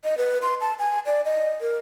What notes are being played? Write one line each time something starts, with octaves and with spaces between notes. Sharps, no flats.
D#5
B4
C6
A5
G#5
D5
D#5
A#4